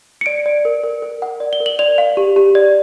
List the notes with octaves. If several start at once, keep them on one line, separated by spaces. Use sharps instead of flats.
C#7
D5 D7
D5
A#4
A#4
A#4
F#5
D5
G7
A#4
F#7
D5 F7
F5
G4
G4
D5